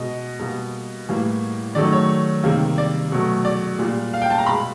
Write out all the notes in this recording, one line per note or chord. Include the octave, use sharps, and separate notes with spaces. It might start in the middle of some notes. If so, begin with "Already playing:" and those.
Already playing: B2 G#3 D#5
B2 G3 A#3
A2 E3 G3 A#3
D#3 F#3 A3 D5
C#5
C3 D#3 G3 A#3
D5
B2 F#3 A3
D5
A#2 G3 A#3
F5
G5
A5
A#5
B2 G#3 B5